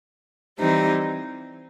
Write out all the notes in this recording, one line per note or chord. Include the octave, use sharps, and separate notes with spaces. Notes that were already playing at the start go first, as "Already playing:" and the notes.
E3 G3 C4 D#4